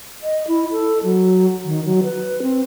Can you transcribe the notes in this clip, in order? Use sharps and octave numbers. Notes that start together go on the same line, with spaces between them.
D#5
E4
A4
F#3
D#3
F#3
B4
C4